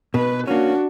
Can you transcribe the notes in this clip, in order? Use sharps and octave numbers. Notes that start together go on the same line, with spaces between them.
B2 B4
A#3 C#4 D4 F#4